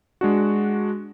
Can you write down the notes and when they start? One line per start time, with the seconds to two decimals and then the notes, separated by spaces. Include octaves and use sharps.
0.21 G#3 D4 F#4